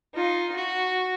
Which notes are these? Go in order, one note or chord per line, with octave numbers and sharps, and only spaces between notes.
D#4 F4
F#4